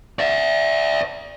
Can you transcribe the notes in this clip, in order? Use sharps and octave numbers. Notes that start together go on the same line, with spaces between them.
D5 E5